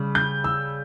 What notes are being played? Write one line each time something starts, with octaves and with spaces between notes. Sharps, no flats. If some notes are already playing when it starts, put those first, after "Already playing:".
Already playing: C#3 G3
G6
E6